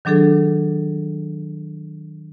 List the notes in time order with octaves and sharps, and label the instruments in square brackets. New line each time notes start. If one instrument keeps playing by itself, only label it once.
[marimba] D#3 F#3 D4 G#4 A4